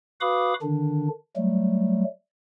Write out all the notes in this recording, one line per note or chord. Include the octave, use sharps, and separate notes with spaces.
F#4 B4 F5 B5 D6 D#6
D3 D#3 D4
F#3 G3 A3